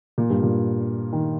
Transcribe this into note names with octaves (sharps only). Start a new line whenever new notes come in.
A#2
G2
A#2
D#3